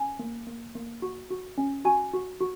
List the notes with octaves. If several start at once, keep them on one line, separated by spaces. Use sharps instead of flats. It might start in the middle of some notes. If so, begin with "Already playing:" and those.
Already playing: C#4 G#5
A#3
A#3
A#3
F#4
F#4
C#4
F#4 G#5
F#4
F#4